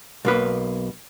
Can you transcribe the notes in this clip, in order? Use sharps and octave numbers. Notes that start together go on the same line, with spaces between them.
B1 A#3 B4